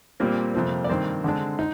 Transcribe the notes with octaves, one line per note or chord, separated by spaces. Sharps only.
A#2 G3 A#3 C4 A#4
F2 C3 F3 C4
D5
G2 D#3 A#3 C4 C5
D3 G#3 D4
D#4